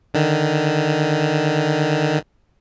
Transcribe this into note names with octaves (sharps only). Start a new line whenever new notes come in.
D3 D#3